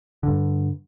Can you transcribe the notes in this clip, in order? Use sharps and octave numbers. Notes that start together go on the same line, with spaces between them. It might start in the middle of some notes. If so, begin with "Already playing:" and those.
G2 D3